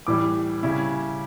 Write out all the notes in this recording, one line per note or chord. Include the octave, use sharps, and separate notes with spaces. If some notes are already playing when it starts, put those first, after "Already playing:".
A2 E3 G3 D6
C#3 G3 C#4 E4